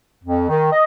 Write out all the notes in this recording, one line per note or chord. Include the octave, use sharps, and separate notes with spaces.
F2
D#3
D#5